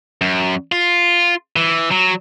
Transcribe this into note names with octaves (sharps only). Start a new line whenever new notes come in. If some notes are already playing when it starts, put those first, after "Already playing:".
F#2
F4
E3
F#3